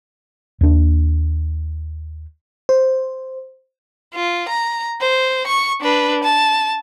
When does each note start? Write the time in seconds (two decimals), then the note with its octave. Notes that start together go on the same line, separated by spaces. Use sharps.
0.61 D#2 D4
2.69 C5
4.15 F4
4.49 A#5
5.01 C5
5.47 C#6
5.82 D4 B4
6.23 A5